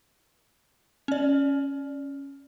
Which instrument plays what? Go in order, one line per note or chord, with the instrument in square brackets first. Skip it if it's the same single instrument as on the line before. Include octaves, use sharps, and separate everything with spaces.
[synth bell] C#4 D5